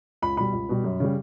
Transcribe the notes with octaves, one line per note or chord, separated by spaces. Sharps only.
C#2 B5
B2 G3 B5
C#2
B2 G3
F#2
C#3 G3